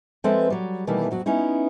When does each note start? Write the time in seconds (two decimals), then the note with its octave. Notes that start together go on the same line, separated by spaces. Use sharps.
0.24 F3 G#3 C4 A4 B4 E5
0.50 F#3 G3
0.87 B2 D#3 E3 G3 A3 A#3
1.11 F2 F#3 F#4
1.26 B3 C#4 D#4 E4